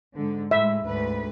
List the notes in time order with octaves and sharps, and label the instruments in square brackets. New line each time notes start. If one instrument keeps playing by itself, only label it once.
[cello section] G#2 D3
[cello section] A2 G#3 [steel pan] E5
[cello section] D2 G#2 B4